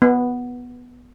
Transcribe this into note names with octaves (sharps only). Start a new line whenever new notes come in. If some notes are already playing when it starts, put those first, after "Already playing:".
B3